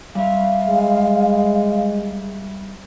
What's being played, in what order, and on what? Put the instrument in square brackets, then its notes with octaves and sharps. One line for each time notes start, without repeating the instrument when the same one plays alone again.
[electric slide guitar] G3 E5 [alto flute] F5
[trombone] G#3